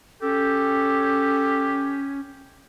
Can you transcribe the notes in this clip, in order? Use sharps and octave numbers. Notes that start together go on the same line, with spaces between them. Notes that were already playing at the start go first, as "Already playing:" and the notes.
C#4 G4 A4